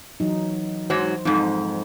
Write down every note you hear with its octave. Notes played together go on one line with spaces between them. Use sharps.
E3 F#3 D#4
G#2 F#3 C5
F2 G#2 D#4 A4